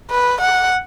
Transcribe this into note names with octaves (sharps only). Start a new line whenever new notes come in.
B4
F#5